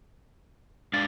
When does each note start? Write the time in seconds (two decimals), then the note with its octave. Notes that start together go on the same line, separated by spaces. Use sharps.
0.93 G#3 D4 F5 A6